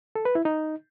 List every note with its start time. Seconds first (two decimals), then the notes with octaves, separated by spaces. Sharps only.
0.15 A4
0.25 B4
0.35 E4
0.45 D#4